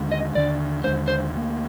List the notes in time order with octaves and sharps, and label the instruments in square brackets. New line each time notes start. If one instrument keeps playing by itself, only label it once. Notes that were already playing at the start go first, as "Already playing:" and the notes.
Already playing: [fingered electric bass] D#2 D3 G#3 D4
[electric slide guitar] D#5
[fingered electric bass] D#2 D3 G#3 D4 [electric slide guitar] D5
[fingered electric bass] D#2 D3 G#3 D4 [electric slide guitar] C5
[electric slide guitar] C5
[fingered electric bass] D2 D3 G3 A#3